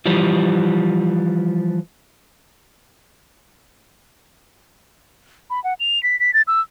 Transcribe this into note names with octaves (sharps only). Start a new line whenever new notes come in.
E3 F3 G3
B5
F#5
F7
B6
B6
A6
E6